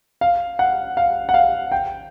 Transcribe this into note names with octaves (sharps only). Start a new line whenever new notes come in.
F5
F#5
F5
F#5
F5
G5